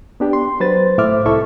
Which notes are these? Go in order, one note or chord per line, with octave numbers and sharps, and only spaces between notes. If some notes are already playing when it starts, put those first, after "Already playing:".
B3 D4 G4
C6
F#3 B4 C5 A6
A2 C5 E5 D6 F6
C2 E4 A4 E5 C#6